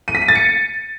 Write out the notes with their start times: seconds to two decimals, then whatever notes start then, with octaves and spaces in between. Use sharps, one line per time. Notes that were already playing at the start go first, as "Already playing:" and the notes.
0.08 D#7
0.15 B6
0.22 D#7
0.28 A6
0.35 C#7